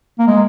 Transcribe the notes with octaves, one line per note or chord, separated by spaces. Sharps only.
A#3
G#3